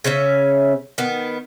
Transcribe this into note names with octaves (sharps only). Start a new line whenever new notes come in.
C#3 C#4 C#5 E5
D#3 B3